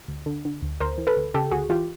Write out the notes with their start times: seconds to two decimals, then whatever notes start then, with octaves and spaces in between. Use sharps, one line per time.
0.08 D2
0.26 D3
0.45 D3
0.62 D2
0.80 D2 A#4 C5
0.98 E3
1.07 A4 B4
1.16 D2
1.34 C#3 G4 A4
1.51 D2 F#4 G#4
1.69 E3 F4 G4